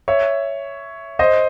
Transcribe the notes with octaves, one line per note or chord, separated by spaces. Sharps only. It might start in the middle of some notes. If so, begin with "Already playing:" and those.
C#5 E5
C5 D#5